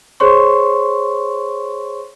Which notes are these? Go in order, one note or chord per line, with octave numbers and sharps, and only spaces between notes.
G#4 C5 C#5 C6 C#6